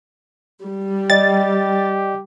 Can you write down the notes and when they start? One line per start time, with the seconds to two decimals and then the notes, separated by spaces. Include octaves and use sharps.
0.64 G3
1.10 G4 D5 D#5 G5 A6